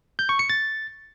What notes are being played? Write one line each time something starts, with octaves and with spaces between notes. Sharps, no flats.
G6
C#6
C#7
A6